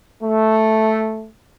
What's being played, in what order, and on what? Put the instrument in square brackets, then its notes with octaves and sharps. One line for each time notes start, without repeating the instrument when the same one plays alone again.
[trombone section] A3